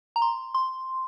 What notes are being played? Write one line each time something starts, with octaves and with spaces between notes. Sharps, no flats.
A#5
C6
C6